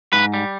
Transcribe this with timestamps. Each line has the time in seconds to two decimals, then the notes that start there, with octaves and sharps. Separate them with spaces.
0.13 G#2 B4
0.34 G3